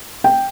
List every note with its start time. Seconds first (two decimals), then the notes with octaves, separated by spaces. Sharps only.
0.24 G5